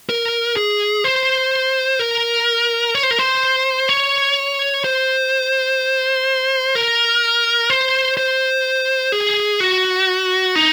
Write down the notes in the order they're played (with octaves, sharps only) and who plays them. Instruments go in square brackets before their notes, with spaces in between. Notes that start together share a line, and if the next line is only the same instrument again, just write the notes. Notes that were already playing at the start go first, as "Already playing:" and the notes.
[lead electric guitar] A#4
G#4
C5
A#4
C#5
C5
A#4
C5
C#5
C5
A#4
C5
C5
G#4
F#4
D#4